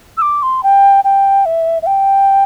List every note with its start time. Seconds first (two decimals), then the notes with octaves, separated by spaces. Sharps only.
0.17 E6
0.22 D6
0.42 C6
0.63 G5
1.04 G5
1.45 E5
1.82 E5
1.86 G5